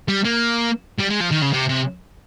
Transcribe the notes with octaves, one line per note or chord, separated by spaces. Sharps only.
G3
A#3
G3
G#3
F3
D#3
C#3
C3
C3